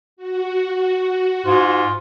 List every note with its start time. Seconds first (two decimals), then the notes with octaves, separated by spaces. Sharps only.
0.17 F#4
1.46 G#2 F4